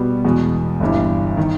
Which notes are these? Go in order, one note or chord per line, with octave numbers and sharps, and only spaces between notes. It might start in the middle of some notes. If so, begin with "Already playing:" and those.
Already playing: B2 G3 B3
E2 B2 G#3
G1 G2 E3
D#3